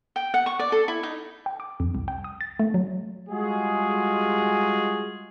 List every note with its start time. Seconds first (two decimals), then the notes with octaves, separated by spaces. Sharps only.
0.16 G5
0.34 F#5
0.46 C#6
0.59 D5
0.72 A4
0.88 E4
1.03 D#4
1.46 G5
1.60 D6
1.80 F2
1.95 C2
2.08 G5
2.24 D#6
2.41 A6
2.59 A3
2.74 F#3
3.29 G3 G#3 F4 F#4 G#4